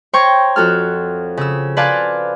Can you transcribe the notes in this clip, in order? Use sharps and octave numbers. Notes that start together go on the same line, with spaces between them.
C5 C#5 G5 A#5 C#6
F2 F#4 A4 F6
C#3 E6
B4 C5 D5 F5 G#5 A5